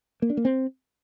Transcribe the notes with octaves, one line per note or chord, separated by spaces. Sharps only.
A#3
D4
A#3
C4